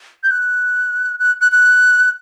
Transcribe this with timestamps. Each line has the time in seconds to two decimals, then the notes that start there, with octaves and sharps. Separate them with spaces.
0.23 G6
0.31 F#6
1.20 F#6
1.41 F#6
1.52 F#6